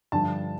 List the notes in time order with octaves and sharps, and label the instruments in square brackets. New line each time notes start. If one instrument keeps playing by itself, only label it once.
[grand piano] G2 D3 F3 A5